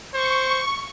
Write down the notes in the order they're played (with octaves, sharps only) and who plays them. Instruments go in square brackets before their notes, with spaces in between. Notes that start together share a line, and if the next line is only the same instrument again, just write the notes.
[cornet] C5 [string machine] C#6